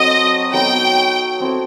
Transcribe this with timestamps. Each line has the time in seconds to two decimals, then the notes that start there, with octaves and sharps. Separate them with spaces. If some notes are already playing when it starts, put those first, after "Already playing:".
Already playing: F#3 C4 F#4 A4 D#5
0.53 F#3 B3 D#4 A4 G5
1.40 C4 E4 A4 C5